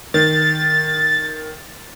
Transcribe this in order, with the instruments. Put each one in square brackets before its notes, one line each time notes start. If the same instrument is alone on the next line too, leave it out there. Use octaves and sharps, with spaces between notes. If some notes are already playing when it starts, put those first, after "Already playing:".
[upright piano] D#3 [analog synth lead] A6